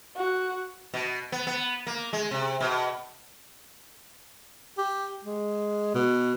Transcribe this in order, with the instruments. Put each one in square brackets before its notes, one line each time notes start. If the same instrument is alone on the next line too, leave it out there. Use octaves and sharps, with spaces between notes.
[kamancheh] F#4
[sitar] B2
B3
B3
A#3
G#3
C3
B2
[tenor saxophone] G4
G#3
B2